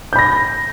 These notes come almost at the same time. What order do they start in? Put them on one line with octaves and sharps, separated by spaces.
G6 B5 A#6